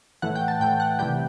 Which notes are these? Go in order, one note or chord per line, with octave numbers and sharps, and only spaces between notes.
A2 E3 A3 F#5
G5
A5
A2 E3 A3 G5
F#5
C3 E3 G3 G5